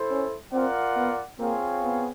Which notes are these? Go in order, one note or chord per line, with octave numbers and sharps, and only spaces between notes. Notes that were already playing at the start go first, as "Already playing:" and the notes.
Already playing: E4 A4 C5
C#4
C4 F4 A#4 D5 F#5
B3
A#3 C4 F4 G#4 C#5 F5
B3